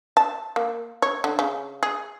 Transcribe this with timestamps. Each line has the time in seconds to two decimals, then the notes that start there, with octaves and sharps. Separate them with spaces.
0.17 A5
0.56 A#3
1.02 C#5
1.24 D3
1.39 C#3
1.83 G#4